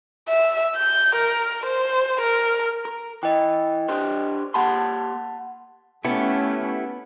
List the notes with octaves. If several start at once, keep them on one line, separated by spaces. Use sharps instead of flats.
E5
G6
A#4
C5
A#4
A#4
E3 D#5 G5
D4 G4 C5
A#3 G4 F#5 A5 B5 C6
A3 B3 C#4 E4 G4 A4